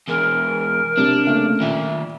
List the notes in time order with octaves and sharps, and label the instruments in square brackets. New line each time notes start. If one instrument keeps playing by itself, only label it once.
[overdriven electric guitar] E2 G#3 [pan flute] A#4
[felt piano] C3 G3 [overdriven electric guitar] D4
[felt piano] C#3 A3 A#3
[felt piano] A#2 [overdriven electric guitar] D#3 E5